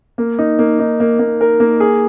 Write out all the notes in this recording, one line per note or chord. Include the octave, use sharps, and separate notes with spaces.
A#3
D#4
A#3
D#4
A#3
A#3
A#4
A#3
G#4